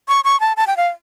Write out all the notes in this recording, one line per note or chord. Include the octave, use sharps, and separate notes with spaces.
C#6
C#6
A5
A5
G5
F5